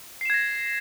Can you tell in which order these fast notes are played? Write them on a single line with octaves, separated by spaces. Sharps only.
C7 E7 G#6 A#6